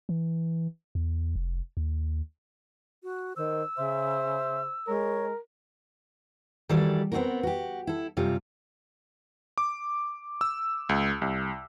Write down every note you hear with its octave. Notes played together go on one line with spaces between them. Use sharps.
E3
E2
F1
D#2
F#4
D#3 C5 E6
C#3 C5 E5
G#3 A#4 C#5
D#3 E3 F#3 G3 A4 D5
B3 C4 D4 D#4 F#4 A#4
F#4 G4
E4 A4
F#2 C3 G3 F4
D6
E6
C#2
C2